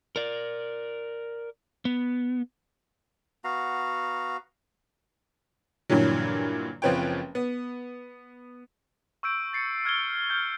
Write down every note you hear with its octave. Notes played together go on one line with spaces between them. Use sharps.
A#4 D5
B3
B3 F#4 F5 A#5
G2 A#2 D3 E3 F#3
F#1 F3 C4 B4 C#5 G5
B3
C#6 E6 G6 D7
A6 C7 C#7
F6 G#6 D7 G7
F6 G6